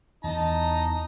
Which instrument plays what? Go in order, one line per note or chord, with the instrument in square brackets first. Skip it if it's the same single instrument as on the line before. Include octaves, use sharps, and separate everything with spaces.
[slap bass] E2 E3 [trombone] D#4 [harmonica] D#5 A5 A#5